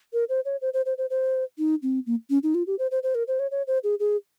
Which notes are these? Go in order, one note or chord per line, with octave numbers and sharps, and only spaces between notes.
A#4
C5
C#5
C5
C5
C5
C5
C5
D#4
C4
A#3
C#4
D#4
F4
G4
C5
C5
C5
A#4
C5
C#5
C#5
C5
G#4
G#4